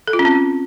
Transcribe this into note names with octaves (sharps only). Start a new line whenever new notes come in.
A4
F4
C#4
C4